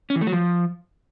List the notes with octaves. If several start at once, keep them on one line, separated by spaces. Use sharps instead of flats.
C#4
E3
A3
F#3
F3